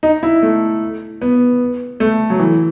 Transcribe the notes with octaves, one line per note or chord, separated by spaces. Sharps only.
D#4
E4
A3
B3
A3
F#3
E3